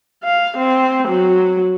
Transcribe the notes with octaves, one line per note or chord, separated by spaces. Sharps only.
F5
C4
F#3